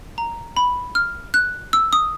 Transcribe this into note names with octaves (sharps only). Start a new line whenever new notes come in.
A#5
B5
F6
F#6
E6
D#6